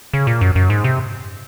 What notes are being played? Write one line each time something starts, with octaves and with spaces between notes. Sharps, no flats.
C#3
A#2
F#2
F#2
G#2
C3